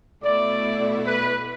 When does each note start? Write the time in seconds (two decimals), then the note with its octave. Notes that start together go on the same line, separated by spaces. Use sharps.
0.23 B2 A3 E4 D5
1.05 B4